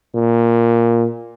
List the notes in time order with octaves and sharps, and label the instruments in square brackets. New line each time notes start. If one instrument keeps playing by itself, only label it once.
[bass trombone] A#2